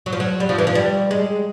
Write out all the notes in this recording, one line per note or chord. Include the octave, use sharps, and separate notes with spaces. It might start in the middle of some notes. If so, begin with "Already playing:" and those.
F#3
F3
F#3
G3
F3
E3
F3
G3
G#3